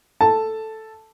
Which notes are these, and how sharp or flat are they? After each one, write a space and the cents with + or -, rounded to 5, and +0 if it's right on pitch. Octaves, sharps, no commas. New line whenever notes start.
A4 +0 A5 +0